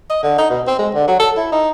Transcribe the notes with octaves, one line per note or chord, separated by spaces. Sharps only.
D#5
D3
D#4
B2
C4
G#3
D3
F#3
A4
E4
D#4